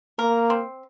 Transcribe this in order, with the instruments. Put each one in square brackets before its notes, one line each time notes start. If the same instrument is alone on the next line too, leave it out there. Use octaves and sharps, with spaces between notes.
[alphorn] A#3 [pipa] A#4
[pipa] C4